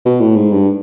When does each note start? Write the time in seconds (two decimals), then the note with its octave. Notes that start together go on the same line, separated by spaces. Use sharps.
0.05 B2
0.21 A2
0.36 G#2
0.52 G2